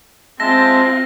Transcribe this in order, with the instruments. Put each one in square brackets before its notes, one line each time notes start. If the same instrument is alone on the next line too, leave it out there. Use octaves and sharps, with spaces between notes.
[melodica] G#3 E5 A5 [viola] C4 F4 [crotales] A#6